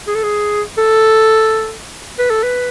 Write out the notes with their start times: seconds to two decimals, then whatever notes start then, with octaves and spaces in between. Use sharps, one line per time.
0.07 G#4
0.15 A4
0.23 G#4
0.78 A4
2.18 B4
2.30 A4
2.43 B4